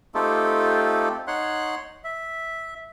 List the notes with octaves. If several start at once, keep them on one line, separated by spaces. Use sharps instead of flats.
A3 C4 D#4 F4 G4 A4
D#4 C#5 F#5 C6 F#6
E5